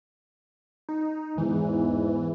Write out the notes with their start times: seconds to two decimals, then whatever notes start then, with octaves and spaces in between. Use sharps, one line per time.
0.89 D#4
1.38 E2 G#2 E3